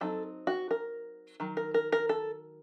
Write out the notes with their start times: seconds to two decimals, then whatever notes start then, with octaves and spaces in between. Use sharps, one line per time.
0.01 F#3 C4 D#4 A4
0.47 F#4
0.71 A#4
1.40 D#3 F#3
1.57 A#4
1.74 A#4
1.92 A#4
2.09 A4